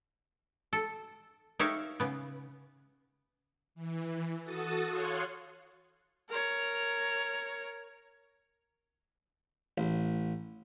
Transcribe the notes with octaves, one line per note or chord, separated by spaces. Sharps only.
A4
D#4 G4 C#5 E5 F5
C#3 B3
E3
F#4 A4 A5 D#6
C#5 F5 C6 F#6 G#6 C#7
A#4 C#5
A1